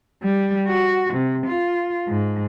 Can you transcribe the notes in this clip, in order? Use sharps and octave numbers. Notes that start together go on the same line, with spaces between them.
G3
F#4
C3
F4
G#2